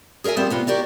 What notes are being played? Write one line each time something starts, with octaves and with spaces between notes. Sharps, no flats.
G#4 A#4 C#5 E5 G#5
F3 G3 B3 C4 C5 E5
C3 B3 F4
E4 F#4 G4 A#4 D5 F5